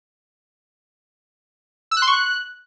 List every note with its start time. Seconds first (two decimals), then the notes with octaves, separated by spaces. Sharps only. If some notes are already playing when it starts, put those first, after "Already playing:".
1.91 E6
1.97 F#6
2.02 C6
2.07 C#6
2.13 F#6